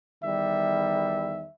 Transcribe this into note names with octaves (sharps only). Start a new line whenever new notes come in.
E2 D#3 G3 E5